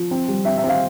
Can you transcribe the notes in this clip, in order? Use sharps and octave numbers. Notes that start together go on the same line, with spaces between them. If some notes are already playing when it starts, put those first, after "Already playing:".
Already playing: F3
C4
G3
C4 E5
E5
C4
F5